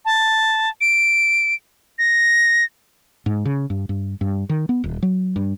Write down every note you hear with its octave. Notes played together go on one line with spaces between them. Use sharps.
A5
D7
A#6
G#2
C#3
G2
G2
G2
D#3
B3
D#1
F#3
G2